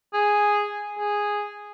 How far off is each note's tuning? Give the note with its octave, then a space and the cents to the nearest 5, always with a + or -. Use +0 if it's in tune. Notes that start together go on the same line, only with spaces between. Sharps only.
G#4 -5
G#4 -5